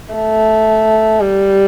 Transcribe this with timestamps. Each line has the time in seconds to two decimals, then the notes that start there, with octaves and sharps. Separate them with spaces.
0.14 A3
1.21 G3